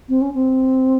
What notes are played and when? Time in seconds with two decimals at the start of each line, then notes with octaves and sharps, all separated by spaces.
0.09 C4
0.21 C#4
0.34 C4